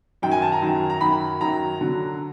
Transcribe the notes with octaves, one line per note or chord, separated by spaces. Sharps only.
F#2 D#3 F#3 G5
G#5
A5
A#5
F#2 D#3 F#3
A#5
F#2 D#3 F#3 B5
F#2 D#3 F#3 A#5
D3 F#3